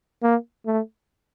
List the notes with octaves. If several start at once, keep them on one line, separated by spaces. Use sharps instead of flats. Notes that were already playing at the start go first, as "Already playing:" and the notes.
A#3
A3